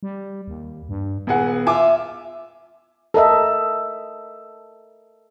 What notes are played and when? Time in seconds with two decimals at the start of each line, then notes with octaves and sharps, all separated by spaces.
0.03 G3
0.48 D#2
0.89 G2
1.27 D#1 B3 G#4 F#5
1.67 F4 E5 F5 G#5 D6
3.14 A4 A#4 D#5 E5